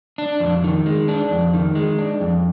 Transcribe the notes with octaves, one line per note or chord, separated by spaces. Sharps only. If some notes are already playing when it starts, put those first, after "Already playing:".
D4
F2
D#3
G#3
D4
F2
D#3
G#3
D4
F2